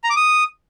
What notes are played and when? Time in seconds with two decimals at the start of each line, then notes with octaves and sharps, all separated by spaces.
0.04 A#5
0.10 D6
0.16 D#6